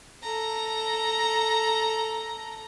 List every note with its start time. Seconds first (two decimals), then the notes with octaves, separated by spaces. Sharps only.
0.23 A4 A#5